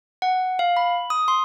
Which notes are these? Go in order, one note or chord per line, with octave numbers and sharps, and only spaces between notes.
F#5
F5
B5
D#6
C6